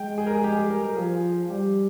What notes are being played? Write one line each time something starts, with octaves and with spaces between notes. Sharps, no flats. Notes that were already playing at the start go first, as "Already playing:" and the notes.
Already playing: G#3 G5
G#4
A#4
G#4
G4
G#4
A#4
A#4
F3 G#4
G3 G4